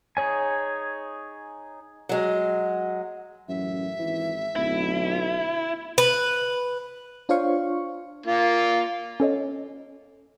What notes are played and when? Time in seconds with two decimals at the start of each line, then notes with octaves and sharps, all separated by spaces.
0.17 D#4 G#4 C#5 G#5
2.09 F#3 G#3
3.48 A1 F#2 E5
3.99 G#1 E3
4.56 D1 B1 E4
5.98 B4
7.29 D4 F4 C5 C#5 F5 C#6
8.26 A#3 F4
9.20 C#4 A4 C#5 D#5